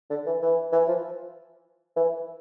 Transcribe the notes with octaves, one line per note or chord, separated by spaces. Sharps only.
D3
E3
E3
E3
F3
E3